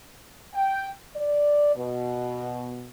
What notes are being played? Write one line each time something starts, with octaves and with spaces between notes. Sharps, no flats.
G5
D5
B2